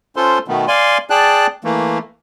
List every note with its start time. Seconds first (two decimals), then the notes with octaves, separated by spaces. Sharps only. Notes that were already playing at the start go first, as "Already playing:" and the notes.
0.16 C#4 F4 A4 C5 C6
0.48 B2 D#3 A3 B3
0.68 D5 F5 G#5 C6
1.10 G#4 D5 G5 A5 F#6
1.64 E3 A3 A#3